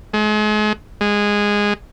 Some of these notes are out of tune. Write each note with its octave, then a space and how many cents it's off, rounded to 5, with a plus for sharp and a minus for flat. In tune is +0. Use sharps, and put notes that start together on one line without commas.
G#3 +40
G#3 -10